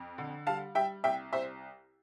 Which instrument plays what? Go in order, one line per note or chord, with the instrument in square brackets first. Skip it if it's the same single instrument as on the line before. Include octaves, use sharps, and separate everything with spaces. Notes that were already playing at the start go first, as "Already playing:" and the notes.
Already playing: [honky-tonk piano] F2
D3
G3 F5 A5
G3 E5 G5
C2 E5 G5
C2 C5 E5